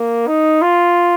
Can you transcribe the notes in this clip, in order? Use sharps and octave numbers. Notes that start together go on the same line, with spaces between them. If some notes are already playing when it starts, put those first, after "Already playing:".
Already playing: A#3
D#4
F4